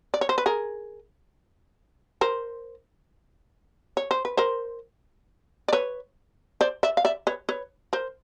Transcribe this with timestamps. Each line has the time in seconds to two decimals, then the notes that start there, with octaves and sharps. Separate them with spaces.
0.14 D5
0.21 C#5
0.29 C5
0.38 B4
0.46 G#4 A#4
2.21 A#4 C5
3.97 C#5
4.11 C5
4.25 B4
4.37 A#4 C5
5.68 D5
5.73 B4 C#5
6.61 C5 D5
6.83 D5 E5
6.97 F5
7.05 D5 E5
7.27 B4 C#5
7.49 B4 C#5
7.93 A#4 C5